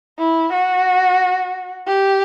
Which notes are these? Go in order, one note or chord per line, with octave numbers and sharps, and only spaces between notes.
E4
F#4
G4